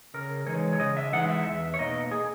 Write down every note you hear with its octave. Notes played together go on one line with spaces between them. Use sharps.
C#3 A#4
E3 G#3 D#4 C#5
C#5
C#3 D#5
E5
E3 G#3 D#4 F#5
E5
E2 E5
C#5
B2 A#3 D#4 D#5
G#4